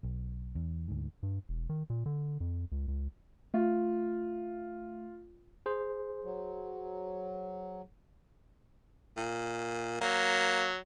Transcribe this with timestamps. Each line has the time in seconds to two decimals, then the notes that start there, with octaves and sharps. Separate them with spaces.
0.03 B1
0.55 E2
0.88 D2 G#2
1.23 G2
1.49 E1
1.69 D#3
1.90 A#2
2.06 D3
2.40 F2
2.72 C#2
2.88 C#2
3.54 A3 F4
5.66 G#4 C5
6.24 F#3
9.17 A#2
10.01 F#3 A#3